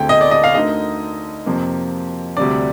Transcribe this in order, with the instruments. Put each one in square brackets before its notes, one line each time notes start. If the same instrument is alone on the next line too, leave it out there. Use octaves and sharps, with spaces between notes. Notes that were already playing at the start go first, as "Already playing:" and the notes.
Already playing: [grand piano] D2 D3 A3 C4 [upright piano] G5
[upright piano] D#5
D5
D#5
F5
[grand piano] D2 D3 A3 D#4 A#4 [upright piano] D#5
[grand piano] F2 C3 F3 A#3
[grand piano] D2 C3 G3 D4 [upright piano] D5